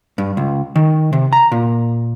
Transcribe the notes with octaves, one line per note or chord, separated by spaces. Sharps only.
G2
C#2
D#3
C3
A#5
A#2